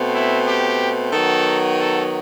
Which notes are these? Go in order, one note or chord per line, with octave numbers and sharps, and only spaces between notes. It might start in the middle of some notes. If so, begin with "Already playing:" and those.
Already playing: B2 A3 C4
E4
G4
D#3 F#3 B3 A4
A4